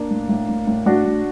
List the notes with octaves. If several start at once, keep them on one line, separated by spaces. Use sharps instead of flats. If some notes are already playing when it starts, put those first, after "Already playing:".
Already playing: A#3 D4
A2
A2
A2
A2
A2 D4 F#4
A2